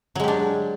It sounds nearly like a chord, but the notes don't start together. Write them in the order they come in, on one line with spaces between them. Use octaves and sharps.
F#3 G#3 G4 D4